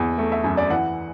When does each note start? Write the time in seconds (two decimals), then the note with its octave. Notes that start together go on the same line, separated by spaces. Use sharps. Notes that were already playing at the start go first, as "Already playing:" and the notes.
Already playing: E2
0.18 A3
0.32 E5
0.44 F#2
0.57 D5
0.70 E3 F#5